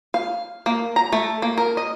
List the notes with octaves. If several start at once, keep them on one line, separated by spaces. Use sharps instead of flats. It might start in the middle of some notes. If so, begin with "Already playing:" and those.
F5
A#3
A#5
A3
A#3
A#4
D#5